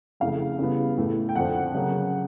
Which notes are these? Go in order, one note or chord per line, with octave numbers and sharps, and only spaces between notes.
F2 C#3 E3 A3 F5
C#3 E3 G3 B3
A2 E3 A3
G5
F2 D3 F3 F#5
C#3 F#3 A#3 C#4